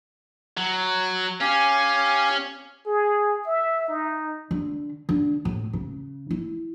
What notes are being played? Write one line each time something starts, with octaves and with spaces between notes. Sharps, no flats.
F#3
C#4 G4 F5 G#5
G#4
E5
D#4
D3
D3
A2
C#3
E4